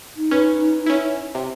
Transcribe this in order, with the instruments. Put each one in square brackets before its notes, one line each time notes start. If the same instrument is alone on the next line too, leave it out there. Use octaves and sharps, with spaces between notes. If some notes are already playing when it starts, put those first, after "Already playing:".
[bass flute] D#4
[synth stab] C#4 [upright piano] B4
[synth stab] C#4 E4
C3